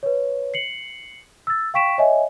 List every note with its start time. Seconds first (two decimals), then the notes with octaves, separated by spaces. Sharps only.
0.03 B4 C#5
0.54 C7 C#7 F#7
1.47 E6 A6
1.74 F5 G5 C#6 B6 D7 E7
1.98 C#5 D#5 E5 G#5